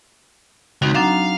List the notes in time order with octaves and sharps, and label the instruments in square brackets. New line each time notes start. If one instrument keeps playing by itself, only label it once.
[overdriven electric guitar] C#2 [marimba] C4 D#4 F#4
[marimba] F#3 D4 A#5 [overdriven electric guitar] F5